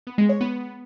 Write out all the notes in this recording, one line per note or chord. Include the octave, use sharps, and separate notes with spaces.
B3
G#3
C#5
B3